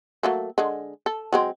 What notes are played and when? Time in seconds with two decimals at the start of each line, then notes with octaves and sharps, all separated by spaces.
0.23 F#3 A3 A#3
0.58 D3 G#3
1.06 A4
1.33 F#3 G#3 C4